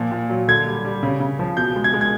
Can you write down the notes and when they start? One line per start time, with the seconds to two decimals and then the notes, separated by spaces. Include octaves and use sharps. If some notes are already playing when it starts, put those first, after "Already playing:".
Already playing: A#2 F3
0.11 A#2
0.29 F#3
0.48 D3 G#6
0.66 G3
0.85 G3
1.03 C#3
1.20 C#3
1.39 F3
1.57 B2 G6
1.76 G#3
1.84 G#6
1.94 G#3
2.01 G#6